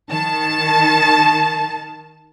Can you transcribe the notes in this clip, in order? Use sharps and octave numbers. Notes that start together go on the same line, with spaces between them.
D#3 A5